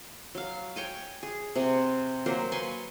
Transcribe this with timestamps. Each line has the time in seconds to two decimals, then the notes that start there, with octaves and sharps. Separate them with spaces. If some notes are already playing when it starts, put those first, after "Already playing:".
0.35 F#3 F5
0.76 C#5 G5 G#5
1.23 G#4
1.55 C3 F#5 G#5
2.26 F#3 A#3 C5
2.52 B4 G#5 C6 C#6